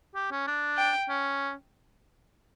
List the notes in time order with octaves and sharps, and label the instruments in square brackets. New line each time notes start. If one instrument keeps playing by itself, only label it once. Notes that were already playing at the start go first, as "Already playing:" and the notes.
[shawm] G4
C#4
D4
[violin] G5
[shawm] C#4